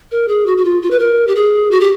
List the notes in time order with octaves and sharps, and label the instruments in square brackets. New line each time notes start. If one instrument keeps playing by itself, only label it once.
[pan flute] A#4
G#4
F#4
F#4
F4
F4
B4
A#4
G4
G#4
F#4
G4